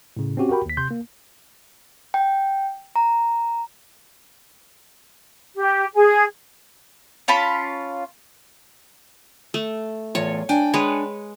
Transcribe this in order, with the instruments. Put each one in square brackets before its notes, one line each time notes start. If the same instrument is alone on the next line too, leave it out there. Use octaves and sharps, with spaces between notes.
[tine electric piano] A2 C#3
C4 C#4 F#4 G4
F#4 G4 A#4 G5 B5
D#2 B6
C3 C6 G6
A#3
[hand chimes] G5
A#5
[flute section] G4
G#4
[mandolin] C#4 F4 A5 B5
[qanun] A3
[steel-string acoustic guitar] E2 A2 F4 [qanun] C#5
[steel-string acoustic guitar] D4 G5 G#5
[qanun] G#3 B4 C#5